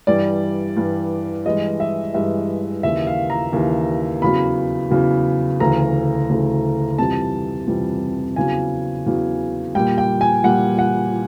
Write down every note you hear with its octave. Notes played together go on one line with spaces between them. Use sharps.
G2 E3 G3 D5
G2 E3 G3
G2 E3 G#3 D#5
E5
G2 E3 G#3 E5
D#2 C#3 E3 E5
F5
A#5
D#2 C#3 E3
E2 C#3 F#3 B5
E2 C#3 F#3
D2 C#3 E3 A3 A#5
D2 C#3 E3 A3
F2 C3 E3 G3 A5
F2 C3 E3 G3
E2 C#3 F#3 G#5
E2 C#3 F#3
A#2 G3 G5
G5
G#5
A#2 G3 F#5
F#5